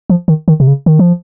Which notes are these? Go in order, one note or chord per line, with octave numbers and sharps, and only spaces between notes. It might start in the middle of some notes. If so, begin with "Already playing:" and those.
F3
D#3
D#3
C3
C#3
D#3
F3